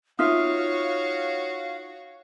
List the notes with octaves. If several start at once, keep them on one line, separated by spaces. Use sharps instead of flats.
D#4 F4 F#4 C#5 E5 F5 D#6 F6